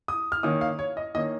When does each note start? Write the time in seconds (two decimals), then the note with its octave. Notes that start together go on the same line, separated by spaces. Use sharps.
0.08 D#6
0.32 F6
0.43 D#3 A#3 C#4 D#6
0.61 F5
0.79 C#5
0.97 D#5
1.15 D#3 A#3 C#4 D#5